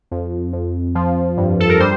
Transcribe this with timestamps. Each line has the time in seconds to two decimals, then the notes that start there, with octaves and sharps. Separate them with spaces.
0.11 F2
0.53 F2
0.95 F3
1.37 G2
1.60 A4
1.69 A#4
1.80 G3 C5